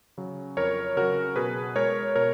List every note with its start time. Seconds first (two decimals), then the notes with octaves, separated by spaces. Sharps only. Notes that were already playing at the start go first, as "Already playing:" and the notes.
0.18 C#3 F#3
0.57 F2 A#4 C#5
0.97 C#3 F#3 F#4 A#4
1.36 B2 G#4 B4
1.75 G#3 A#4 C#5
2.16 B2 A#4 C#5